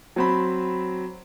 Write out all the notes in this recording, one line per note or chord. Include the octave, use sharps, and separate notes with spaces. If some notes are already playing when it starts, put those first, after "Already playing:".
F#3 C4 B5